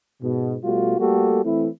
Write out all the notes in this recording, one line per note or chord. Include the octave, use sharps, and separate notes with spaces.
G#2 B2
B2 G3 A3 F4 F#4
G3 A3 A#3 F#4 G4 A4
E3 A3 C4 E4